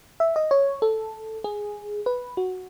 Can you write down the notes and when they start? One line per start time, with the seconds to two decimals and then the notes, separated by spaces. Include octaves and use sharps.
0.20 E5
0.36 D#5
0.51 C#5
0.82 A4
1.44 G#4
2.06 B4
2.37 F#4